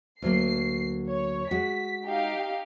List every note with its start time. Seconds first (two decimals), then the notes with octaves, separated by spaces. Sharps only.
0.22 D2 F#3 A#3 C7
1.10 C#5
1.51 G#3 F#4 B6
2.05 D#4 G4 F5